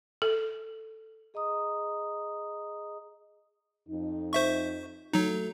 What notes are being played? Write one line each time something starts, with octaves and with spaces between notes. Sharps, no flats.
A4
G#4 D#5 A#5 D#6
F2 D#4
C5 E5 C#6
F#3 A3 D#4 F#4 A4